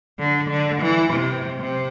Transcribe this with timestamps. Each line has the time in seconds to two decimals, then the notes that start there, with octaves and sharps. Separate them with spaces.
0.19 D3
0.50 D3
0.82 E3
1.13 C3
1.59 C3